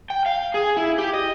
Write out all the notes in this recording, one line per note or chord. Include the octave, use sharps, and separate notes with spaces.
G5
F5
G#4
E4
G4
D#5